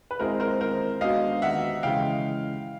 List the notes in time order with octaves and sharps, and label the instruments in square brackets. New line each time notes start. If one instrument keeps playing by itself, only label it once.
[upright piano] B4
[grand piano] G#3 C4 E4 G#4 [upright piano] A#4 C5
[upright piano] A#4 C5
A#4 C5
[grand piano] G#3 B3 D4 F#4 [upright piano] D#5 F5
[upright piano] E5 F#5
[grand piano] C#3 E3 G#3 [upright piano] F5 G5